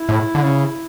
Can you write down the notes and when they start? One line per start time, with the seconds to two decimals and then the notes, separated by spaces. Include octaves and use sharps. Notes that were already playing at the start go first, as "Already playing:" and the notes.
Already playing: E4
0.09 A2
0.35 D3
0.43 C#3